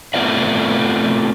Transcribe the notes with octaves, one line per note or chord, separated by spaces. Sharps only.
A3 B3 C4 F4 D5 E5